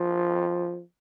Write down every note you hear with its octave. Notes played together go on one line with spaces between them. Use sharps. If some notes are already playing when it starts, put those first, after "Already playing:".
Already playing: F3